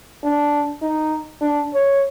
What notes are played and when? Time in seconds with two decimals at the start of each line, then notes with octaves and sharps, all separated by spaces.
0.24 D4
0.82 D#4
1.42 D4
1.74 C#5